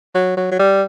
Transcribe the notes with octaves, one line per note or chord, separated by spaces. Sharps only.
F#3
F#3
F#3
G3